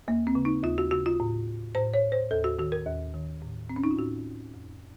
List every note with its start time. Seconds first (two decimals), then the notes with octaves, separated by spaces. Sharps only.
0.08 D#2 A#3
0.27 C4
0.35 C#3
0.45 D#4
0.63 D#2 F4
0.78 F#4
0.91 C#3 F#4
1.06 F4
1.20 A2
1.75 A2 C5
1.94 C#5
2.12 C5
2.31 D#2 A4
2.44 F#4
2.59 D#3 F#4
2.72 A#4
2.87 D#2
3.14 D#3
3.42 A2
3.70 C4
3.76 C#4
3.84 D#4
3.91 F4
3.98 A2 F#4
4.54 F2